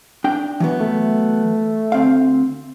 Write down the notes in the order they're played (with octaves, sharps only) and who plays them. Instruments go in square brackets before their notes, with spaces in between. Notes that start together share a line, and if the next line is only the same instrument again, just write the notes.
[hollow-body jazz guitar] D4 G5
E3 F#3 B3
[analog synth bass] A3
[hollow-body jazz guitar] D2 C4 F5